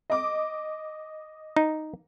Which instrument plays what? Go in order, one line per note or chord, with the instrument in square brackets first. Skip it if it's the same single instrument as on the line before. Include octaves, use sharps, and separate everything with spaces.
[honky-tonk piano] D#5 D6
[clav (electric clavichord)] D#4